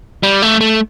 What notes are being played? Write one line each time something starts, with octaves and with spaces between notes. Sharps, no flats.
G3
A3
A3